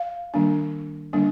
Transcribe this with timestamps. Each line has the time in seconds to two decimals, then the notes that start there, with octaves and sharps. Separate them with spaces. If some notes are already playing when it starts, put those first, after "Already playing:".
Already playing: F5
0.34 D#3 G3 A#3 D4
1.13 D3 G3 A#3 D4